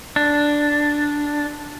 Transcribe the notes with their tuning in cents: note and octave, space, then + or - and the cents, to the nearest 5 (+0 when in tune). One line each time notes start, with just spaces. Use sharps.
D4 +0